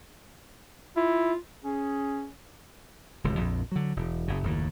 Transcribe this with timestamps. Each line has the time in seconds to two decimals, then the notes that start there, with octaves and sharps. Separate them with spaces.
0.96 E4 F4
1.63 C#4 G#4
3.24 D1 C#2
3.39 A#1 F2
3.72 D3 F#3
3.96 E1
4.28 F#1 C#3
4.43 F#1 D#2 A2